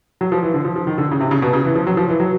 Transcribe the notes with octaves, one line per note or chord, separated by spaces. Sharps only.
F#3
F3
E3
D3
F3
F3
D#3
D3
C#3
C3
C#3
B2
C#3
E3
F3
F#3
F3
E3
F#3